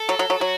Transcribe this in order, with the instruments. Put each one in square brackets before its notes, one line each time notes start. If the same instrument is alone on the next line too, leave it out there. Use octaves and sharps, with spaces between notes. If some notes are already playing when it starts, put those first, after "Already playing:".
Already playing: [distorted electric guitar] A4
[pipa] F#3
F#3
F#3
[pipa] F#3 [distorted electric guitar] F#4